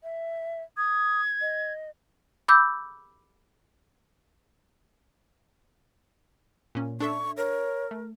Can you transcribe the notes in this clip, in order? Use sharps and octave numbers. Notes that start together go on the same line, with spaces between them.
E5
D#6 G#6
D#5
B5 D6 E6 G6
A#2 C#4
D4 A4 E5 C#6
A#4 C#5
A3